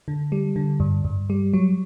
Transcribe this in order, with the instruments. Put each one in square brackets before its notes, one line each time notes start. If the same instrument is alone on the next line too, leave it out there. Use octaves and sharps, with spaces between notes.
[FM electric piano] D3
G3
D3
G2
G2
G3
F#3